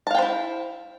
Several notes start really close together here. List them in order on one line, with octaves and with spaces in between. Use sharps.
A5 F5 G5 C5 E4